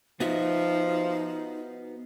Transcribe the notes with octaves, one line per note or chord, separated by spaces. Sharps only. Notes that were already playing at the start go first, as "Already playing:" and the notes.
F3 B3 D#4 F#4 E5